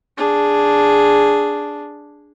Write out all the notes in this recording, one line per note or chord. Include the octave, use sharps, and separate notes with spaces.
D4 G#4